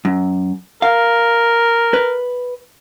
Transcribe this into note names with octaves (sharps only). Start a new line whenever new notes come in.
F#2
A#4 F5
B4